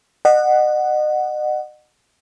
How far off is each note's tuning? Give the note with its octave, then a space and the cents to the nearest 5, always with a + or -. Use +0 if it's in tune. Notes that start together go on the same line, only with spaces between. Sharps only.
D#5 -35 F#5 +0